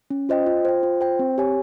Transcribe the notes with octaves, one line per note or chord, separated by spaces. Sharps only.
C#4
F4 C5 D#5 G5
F4
C5 G5
F4
C5 G5
C4
G4 C#5 G#5